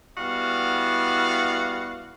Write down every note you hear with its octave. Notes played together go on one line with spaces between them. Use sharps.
G3 B3 E4 F#4 D5 F5